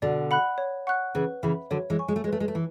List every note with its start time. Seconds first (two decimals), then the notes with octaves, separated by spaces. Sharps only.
0.02 B2 D3 D5
0.31 F#5 B5 F#6
0.58 C#5
0.87 F#5 C#6 F#6
1.15 C#3 E3 B4
1.43 C#3 E3 E5 B5
1.71 D3 F#3 C#5
1.90 E3 G#3
1.99 G#5 C#6
2.08 G#3
2.16 A3
2.24 G#3
2.28 A3 B4
2.40 G#3
2.48 A3
2.55 E3